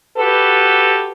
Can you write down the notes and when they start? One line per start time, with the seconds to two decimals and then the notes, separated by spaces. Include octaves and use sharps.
0.17 F#4 G4 A4 B4